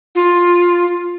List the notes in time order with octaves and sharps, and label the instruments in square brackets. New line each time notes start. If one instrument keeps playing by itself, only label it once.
[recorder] F4